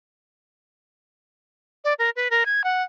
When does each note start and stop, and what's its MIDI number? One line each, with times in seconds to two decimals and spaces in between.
1.84 1.94 74
1.99 2.10 70
2.16 2.28 71
2.31 2.44 70
2.46 2.62 92
2.64 2.83 78